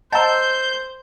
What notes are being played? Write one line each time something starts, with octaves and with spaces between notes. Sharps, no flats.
C5 D#5 F#5 A5 A#5 E6 G6